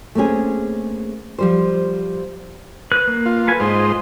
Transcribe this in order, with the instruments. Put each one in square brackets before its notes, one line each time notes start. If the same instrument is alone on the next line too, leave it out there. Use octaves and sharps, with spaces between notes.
[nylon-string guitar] A3 A#3 C4 C#4 G#4
F3 G3 C5
[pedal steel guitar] B4 F#6
A#3
[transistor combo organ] F4
[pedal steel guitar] A4 B4 G#5
[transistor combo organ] G#2 C5 [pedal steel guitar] F4 D#5